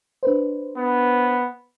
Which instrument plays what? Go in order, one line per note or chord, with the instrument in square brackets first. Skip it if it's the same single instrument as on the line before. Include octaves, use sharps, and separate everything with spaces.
[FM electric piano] D4 B4 C5
[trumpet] B3